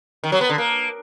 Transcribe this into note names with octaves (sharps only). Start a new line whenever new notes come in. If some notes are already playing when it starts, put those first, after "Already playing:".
D#3
F#3
B3
D3
A#3